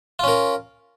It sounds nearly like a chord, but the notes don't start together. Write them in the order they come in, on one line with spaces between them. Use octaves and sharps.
F4 C#4 A#4